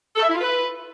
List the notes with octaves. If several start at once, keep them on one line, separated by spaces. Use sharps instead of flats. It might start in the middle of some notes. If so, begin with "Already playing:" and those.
A4
E5
E4
F4
B4